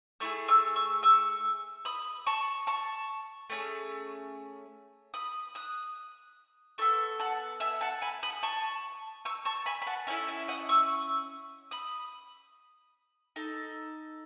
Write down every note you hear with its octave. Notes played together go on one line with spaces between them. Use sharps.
A3 E4 G#4 C#6 E6
C#6 E6
C#6 E6
C#6 E6
B5 D#6
A5 C#6
A5 C#6
A3 C#4 G#4
B5 D#6
D#6 F#6
B3 D#4 A4 C#6 E6
F#5 A5
E5 G#5
F#5 A5
G#5 B5
B5 D#6
A5 C#6
C#6 E6
A5 C#6
G#5 B5
B5
F#5 A5
C#4 E4 A4 E5 G#5
E5 G#5
D#5 F#5
C#6 E6
B5 D#6
D#4 A4